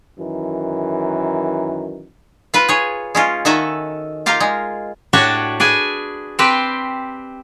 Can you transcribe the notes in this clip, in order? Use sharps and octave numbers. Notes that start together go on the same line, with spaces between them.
F#2 D#3 E3
F4 B4
G#4 C#5
G#3 C#4 F4
D#3 F#4 A4 E5 G#5 A#5
F4 G4 A#4 F5
G#3
A2 D4 F#4 G4 C#5 A5
D4 G#4 B4 G#5
C4 G4 B4 C5